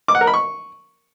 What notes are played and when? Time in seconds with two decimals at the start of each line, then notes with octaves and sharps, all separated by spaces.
0.08 D6
0.15 F#5
0.21 A#4
0.27 B5
0.34 C#6